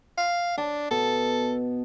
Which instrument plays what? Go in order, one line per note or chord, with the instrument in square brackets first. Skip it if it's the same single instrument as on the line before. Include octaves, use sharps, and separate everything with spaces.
[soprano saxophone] F5
[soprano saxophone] D4 [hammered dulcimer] A5
[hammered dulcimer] B2 [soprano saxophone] A4